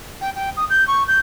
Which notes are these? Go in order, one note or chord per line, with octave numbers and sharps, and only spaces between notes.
G5
G5
D#6
G6
C#6
G6